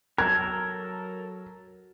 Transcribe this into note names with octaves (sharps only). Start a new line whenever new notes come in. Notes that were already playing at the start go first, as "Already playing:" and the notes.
F#3 A4 A#4 G#6